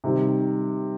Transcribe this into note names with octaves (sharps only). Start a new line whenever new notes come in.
C3 D#3 G3